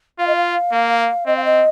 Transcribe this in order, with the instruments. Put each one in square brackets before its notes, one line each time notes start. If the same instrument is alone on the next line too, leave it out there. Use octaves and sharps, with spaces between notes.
[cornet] F4 [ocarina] F5
[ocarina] D#5
F5
[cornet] A#3
[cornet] C4 [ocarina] D#5
[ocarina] F5
D#5